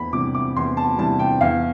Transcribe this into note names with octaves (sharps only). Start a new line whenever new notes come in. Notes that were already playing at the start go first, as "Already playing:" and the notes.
Already playing: E2 B5
C3 E3 G3 D6
D6
E2 C6
A5
C3 E3 G3 A5
G5
E2 F5